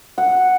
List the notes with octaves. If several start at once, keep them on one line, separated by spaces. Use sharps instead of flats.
F#5